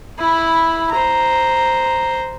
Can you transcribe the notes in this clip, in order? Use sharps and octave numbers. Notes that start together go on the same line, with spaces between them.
E4 B5
C5 A#5